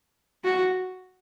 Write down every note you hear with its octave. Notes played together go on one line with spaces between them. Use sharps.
F#4